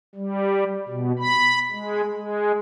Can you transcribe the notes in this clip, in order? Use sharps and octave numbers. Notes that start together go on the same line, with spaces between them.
G3
B2
B5
G#3
G#3